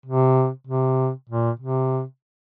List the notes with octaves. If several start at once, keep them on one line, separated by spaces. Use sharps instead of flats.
C3
C3
A#2
C3